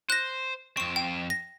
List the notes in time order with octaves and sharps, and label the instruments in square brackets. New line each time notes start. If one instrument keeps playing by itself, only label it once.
[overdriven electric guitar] C5 [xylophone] F#6 A#6
[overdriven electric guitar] F2 C4 [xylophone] C#6 E7
[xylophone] G5
A#6